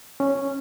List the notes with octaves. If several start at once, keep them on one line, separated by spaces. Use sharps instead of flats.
C#4